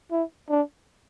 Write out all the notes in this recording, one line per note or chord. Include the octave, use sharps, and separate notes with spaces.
E4
D4